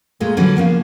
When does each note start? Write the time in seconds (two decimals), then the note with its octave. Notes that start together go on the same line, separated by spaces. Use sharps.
0.20 A#2 G#3 A3
0.37 D3 E3 F#3 G3 C#4
0.56 C#3 F3 A#3 B3